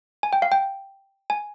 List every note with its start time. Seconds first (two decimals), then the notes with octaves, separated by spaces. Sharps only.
0.23 G#5
0.33 G5
0.42 F5
0.52 G5
1.30 G#5